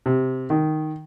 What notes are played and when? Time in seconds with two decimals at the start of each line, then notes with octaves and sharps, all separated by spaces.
0.06 C3
0.50 D#3